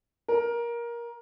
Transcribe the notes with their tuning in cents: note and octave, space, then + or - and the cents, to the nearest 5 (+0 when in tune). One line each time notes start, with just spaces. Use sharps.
A#4 +15